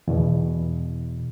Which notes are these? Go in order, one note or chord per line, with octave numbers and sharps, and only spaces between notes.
E2 B2